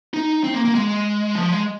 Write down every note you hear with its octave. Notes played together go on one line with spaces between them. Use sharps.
D#4
C4
A#3
A#3
G#3
F3
G#3